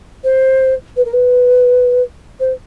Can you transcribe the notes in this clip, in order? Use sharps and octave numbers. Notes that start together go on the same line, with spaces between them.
C5
B4
A#4
B4
C5